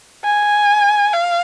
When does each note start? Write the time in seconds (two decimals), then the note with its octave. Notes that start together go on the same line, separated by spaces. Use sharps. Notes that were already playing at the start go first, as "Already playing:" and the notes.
0.24 G#5
1.13 F5